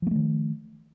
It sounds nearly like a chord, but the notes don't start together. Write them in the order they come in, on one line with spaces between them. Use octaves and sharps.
F3 A#3 A3 D#3